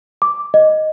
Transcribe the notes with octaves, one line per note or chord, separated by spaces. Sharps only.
D6
D#5